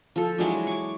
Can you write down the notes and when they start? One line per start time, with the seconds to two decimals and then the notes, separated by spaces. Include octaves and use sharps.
0.16 F3 A4
0.38 E3 F#3 G#3 D4
0.67 C#6 D6